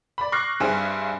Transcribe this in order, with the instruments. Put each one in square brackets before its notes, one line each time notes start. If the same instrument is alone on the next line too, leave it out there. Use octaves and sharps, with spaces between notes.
[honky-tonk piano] D5 B5
C#6 D6 F6 F#6 A#6 C7
G2 C4 G#4 C5 E5 G#5